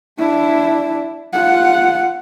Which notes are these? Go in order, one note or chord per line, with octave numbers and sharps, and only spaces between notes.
D4 E4
F4 F#5